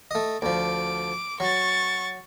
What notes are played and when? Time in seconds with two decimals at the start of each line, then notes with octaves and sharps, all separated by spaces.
0.11 A3 D#5
0.42 D2 F3 D6
1.40 F#3 C#6 A6